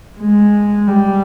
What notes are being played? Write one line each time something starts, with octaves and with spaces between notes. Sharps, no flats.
G#3
G3